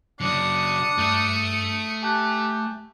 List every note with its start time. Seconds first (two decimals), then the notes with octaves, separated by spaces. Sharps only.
0.21 C#3 F#3 D4 D#6 C#7
0.98 G2 A3 A4
2.03 G4 G#5 A5 F#6